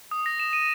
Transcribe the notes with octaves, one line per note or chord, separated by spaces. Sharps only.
D#6
A#6
E7
D#7